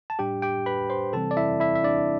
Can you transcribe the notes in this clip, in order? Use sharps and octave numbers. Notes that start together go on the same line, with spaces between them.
A5
A2 G3 D4 G4 G5
G4 G5
B4 B5
C5 C6
C3 E3 G3 C4 A4 A5
D5
E4 E5
E4 E5
E5
D4 D5